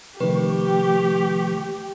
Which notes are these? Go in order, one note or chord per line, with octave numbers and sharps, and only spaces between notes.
C3 D#3 F3 A3 G4 B4 C#6